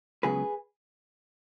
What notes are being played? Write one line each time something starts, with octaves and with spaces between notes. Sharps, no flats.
C#2 C#3 F#3 B3 G#4 B4